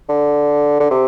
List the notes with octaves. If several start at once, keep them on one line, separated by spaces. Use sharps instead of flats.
D3
D3
C3